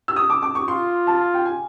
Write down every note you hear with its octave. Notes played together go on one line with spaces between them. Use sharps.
E6
D#6
D6
D6
C#6
F4 C6
A5
G5
G#5